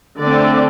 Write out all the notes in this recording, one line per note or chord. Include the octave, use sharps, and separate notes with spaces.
D3 A3 C4 D5